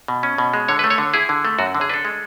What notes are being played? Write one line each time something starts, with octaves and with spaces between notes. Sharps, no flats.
B2
C#4
B2
G#3
D3 C#5
B4
A3
C#5
D3
E4 G#4
D3
A3
F#2 F#4
D3
G#4
D4 A4 B4
G#3